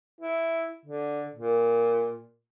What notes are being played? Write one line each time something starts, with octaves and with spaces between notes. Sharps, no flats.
E4
D3
A#2